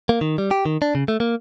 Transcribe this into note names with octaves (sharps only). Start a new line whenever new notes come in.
A#3
D#3
G3
G4
D#3
D4
C#3
A3
A#3